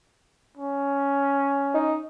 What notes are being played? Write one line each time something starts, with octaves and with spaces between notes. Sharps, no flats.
C#4
D#4